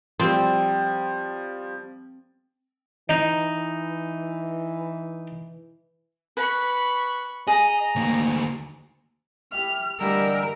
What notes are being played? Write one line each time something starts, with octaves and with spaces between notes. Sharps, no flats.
F3 G3 C4
E3 D#4
B4 B5 C#6
G#4 D#5 A#5
D2 A#3
E4 G4 E5 F6
D3 E3 G3 G#3 A#4 E6